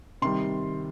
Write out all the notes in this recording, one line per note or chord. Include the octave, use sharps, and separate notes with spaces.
C3 D#3 G3 C6